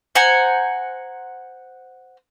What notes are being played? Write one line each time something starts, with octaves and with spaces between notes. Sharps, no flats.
C5 F#5 G#5 A#5